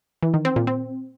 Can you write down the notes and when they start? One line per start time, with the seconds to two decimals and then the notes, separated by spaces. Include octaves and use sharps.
0.23 E3
0.34 D#3
0.45 C4
0.56 A#2
0.67 C4